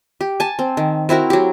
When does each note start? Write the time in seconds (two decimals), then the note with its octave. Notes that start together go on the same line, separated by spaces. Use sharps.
0.21 G4
0.40 G#5 A5
0.59 C4
0.77 D#3
1.09 C4 E4 F#4 A#4
1.30 F#3 G4